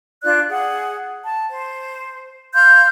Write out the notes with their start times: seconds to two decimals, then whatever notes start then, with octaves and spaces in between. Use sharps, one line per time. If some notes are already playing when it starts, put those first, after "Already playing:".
0.23 D4 F4 D5 F#6
0.49 G#4 F#5
1.24 A5
1.49 C5
2.54 F5 C6 F6 G6